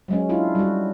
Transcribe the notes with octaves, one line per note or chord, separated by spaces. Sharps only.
F#3 G#3 C#4
D4 E4 F4
G3 F#4